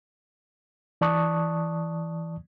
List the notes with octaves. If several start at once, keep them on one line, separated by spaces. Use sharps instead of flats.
E3 D5 A5 C#6 D#6 F#6